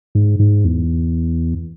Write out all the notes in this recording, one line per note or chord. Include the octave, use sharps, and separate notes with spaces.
G#2
G#2
E2